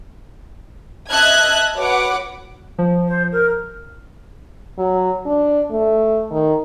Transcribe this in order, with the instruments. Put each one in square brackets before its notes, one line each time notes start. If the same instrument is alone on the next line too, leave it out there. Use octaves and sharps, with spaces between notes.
[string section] D#5 E5 A5 F#6 G#6
F#4 B4 C#5 F#5 D6
[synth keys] F3
[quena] C5
A#4
[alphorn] F#3
D4
A3
D#3